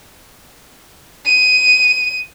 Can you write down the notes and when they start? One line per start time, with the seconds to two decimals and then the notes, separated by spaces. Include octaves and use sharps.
1.26 D#7